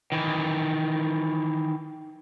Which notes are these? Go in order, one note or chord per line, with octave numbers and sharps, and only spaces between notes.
D#3 E3